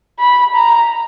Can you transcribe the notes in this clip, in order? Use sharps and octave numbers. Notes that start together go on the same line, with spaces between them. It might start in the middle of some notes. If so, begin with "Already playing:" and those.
B5
A#5